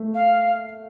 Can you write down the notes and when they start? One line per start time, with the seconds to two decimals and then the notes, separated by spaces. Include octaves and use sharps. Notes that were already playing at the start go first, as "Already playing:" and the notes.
Already playing: A3
0.14 F5